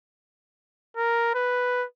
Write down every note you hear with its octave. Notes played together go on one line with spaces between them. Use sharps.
A#4
B4